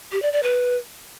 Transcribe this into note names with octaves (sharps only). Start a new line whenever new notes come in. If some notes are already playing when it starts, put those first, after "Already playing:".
G4
D5
D5
B4